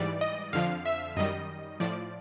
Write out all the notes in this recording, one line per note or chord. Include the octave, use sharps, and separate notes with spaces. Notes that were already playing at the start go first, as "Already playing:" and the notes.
Already playing: G#2 E3 G3 D5
D#5
F2 D3 F3 F5
E5
F#2 D#3 G3 D#5
A2 F3 D5